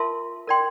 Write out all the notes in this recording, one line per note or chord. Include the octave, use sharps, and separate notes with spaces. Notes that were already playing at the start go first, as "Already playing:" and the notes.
Already playing: F4 A#4 E5 A5 C6
A#4 D5 G5 C6